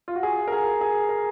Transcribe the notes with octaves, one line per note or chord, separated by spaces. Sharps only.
F4
F#4
G#4
A#4
G#4
G#4
A#4